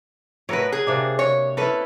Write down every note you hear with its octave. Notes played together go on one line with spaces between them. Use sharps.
A2 F#4 A#4 B4 C#5
G#4
C3 A#3 D4
C#5
C#4 E4 A4 B4